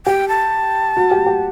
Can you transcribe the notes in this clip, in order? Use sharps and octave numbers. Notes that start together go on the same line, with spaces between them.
G4 G5
A5
F#4
G4
G4